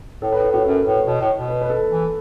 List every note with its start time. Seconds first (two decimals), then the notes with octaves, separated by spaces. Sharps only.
0.22 A2 A4
0.32 A2 B4
0.44 A4
0.51 A2 F#4
0.64 F#2 A4
0.85 A2 B4
1.07 B2 C#5
1.20 A2
1.35 B2
1.49 B4
1.61 B4
1.70 A4
1.91 E3